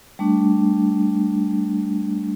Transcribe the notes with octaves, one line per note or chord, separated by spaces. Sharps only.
G3 A3 D4